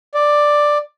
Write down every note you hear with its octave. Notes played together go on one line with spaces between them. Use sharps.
D5